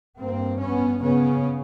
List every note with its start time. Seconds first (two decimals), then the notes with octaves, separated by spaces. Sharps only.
0.17 G2 A#3 C4
0.59 B3 C#4
1.01 C#3 B3 C#4